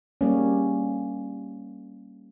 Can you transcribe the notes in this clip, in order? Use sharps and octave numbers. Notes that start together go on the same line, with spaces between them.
G3 A#3 C#4